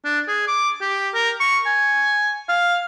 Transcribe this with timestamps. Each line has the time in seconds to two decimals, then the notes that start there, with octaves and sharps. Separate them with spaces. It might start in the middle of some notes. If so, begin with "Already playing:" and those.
0.05 D4
0.28 G#4
0.48 D6
0.81 G4
1.14 A#4
1.40 C#6
1.66 G#5
2.49 F5